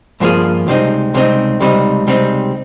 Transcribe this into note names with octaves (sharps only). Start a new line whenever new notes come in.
G2 F3 A#3 F4 G#4
C#2 C3 G3 C4 D#4
C#2 C3 G3 C4 D#4
C#2 C3 G3 C4 D#4
C#2 C3 G3 C4 D#4